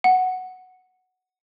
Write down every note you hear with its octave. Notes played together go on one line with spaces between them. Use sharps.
F#5